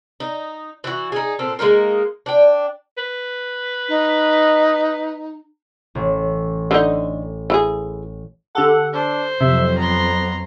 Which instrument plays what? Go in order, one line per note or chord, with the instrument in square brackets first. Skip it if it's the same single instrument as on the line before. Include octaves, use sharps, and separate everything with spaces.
[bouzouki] D#4
E3 F#4
D#4 G#4
A#2 C4 A4
G#3 A#3 D#4 A#4
D4 G5
[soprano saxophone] B4
[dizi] D#4
[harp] A1
[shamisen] D3 D#4
E3 F4 G#4
[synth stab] D3 G4 A4 [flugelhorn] F#5
[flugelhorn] D4 [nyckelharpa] C5
[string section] F2 F#3 [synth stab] C3 [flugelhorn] E5
[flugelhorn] B3 [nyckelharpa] A#5 C6